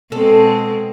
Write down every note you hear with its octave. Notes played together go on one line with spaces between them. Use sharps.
B2 G#3 C4 A4